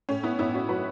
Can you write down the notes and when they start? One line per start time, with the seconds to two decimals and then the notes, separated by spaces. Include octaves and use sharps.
0.09 A2 C#4
0.23 B3 E4
0.39 A1 B3 E4
0.54 C#4 F#4
0.69 F#3 F#4 B4